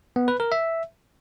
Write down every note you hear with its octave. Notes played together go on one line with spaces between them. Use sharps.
B3
B4
A#4
E5